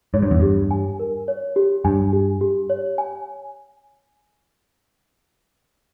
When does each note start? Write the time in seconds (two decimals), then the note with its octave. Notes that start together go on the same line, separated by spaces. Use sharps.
0.14 G#2 C#5
0.22 G2
0.31 E2
0.40 G2 G4
0.71 G#5
0.99 A#4
1.28 C#5
1.56 G4
1.85 G2 G#5
2.13 G4
2.41 G4
2.70 C#5
2.98 G#5